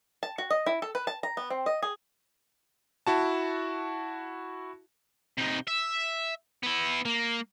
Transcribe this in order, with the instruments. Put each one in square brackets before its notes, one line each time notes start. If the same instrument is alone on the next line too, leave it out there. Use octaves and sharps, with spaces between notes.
[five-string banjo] A5
F#4
D#5
E4
A4
B4
A5
A#5
B3
C4
D#5
G#4
[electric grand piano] E4 F#4 A5
[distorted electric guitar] C3 D#4
E5
B3 E4
A#3